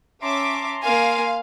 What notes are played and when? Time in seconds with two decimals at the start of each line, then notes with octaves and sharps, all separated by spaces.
0.22 C#4 E5 A5 A#5 C6 D6
0.83 A#3 F5 G#5 C6